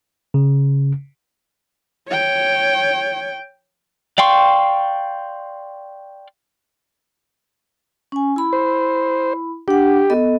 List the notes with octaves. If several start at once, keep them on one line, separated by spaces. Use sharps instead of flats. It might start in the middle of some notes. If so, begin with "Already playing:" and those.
C#3
C#5 G5
D5 F5 G5 C6 C#6
C#4 G#5
E4 B5
C5
D4 G4 F#5
B3 A4 D#5